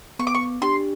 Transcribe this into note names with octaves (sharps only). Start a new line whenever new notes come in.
B3 C#6
D6
C#6
D4 G4 C6